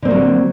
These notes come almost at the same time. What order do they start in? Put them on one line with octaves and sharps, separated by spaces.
D3 C4 A#3 F#3